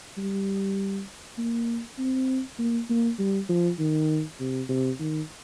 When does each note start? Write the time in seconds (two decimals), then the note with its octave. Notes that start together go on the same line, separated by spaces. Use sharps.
0.17 G3
1.38 A#3
1.98 C4
2.59 A#3
2.89 A#3
3.19 G3
3.49 F3
3.79 D#3
4.40 C3
4.69 C3
5.00 D#3